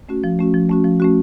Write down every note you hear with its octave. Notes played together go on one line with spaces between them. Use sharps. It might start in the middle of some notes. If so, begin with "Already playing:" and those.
A3 C#4 F#4
F3
A3 C#4 F#4
F3
A3 C#4 F#4
F3
A3 C#4 F#4